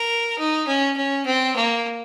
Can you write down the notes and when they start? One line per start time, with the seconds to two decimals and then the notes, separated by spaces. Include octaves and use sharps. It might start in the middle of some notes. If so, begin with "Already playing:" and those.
Already playing: A#4
0.39 D#4
0.67 C#4
0.97 C#4
1.26 C4
1.56 A#3